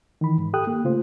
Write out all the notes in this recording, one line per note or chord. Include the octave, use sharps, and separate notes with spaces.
D#3 E3 B5
G#2
G4 A4 G5 D#6 F#6
A#3
C#3 A3 F4 C5